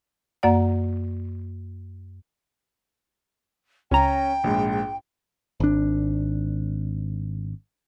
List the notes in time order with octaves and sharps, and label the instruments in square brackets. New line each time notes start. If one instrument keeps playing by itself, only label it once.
[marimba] F#2 A#3 D5 F#5
[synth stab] C#2 A#5 [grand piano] C#4 [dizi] G5
[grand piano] A#1 G#2
[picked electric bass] G#1 D4